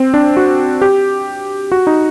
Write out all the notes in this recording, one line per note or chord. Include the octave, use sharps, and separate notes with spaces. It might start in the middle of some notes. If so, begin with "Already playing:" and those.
Already playing: C4
D4
F#4
G4
F#4
D#4